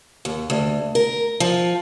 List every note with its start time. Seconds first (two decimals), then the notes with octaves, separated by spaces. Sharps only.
0.25 D#2
0.50 D2
0.95 A#4
1.40 F3